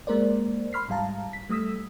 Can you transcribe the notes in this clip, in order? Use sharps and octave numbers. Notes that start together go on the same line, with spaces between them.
G#3 A#3 A#4 C5 D5
B5 C6 F6 B6 C7
G#2 G3 F5 A5 A#5
B6
G3 A3 D#6 E6 B6